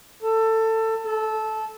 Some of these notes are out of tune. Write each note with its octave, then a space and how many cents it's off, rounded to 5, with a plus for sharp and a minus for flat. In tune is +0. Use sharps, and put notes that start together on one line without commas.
A4 +20
A4 -15